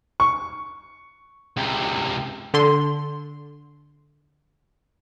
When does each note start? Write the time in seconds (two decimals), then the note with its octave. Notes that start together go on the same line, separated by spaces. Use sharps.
0.20 C#6
1.57 C#2 C3
2.54 D3 C6